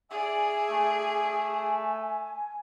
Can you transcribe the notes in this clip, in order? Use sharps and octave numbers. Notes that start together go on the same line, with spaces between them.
G#4 D5 E5 G#5
A3